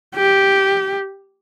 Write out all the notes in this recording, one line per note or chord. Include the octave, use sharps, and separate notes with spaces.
G4